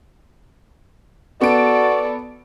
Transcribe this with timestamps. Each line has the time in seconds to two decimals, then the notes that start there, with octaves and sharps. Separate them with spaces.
1.41 B3 F#4 A4 D5 D7